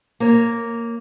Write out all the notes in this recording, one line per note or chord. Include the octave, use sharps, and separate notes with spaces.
A#3 C#5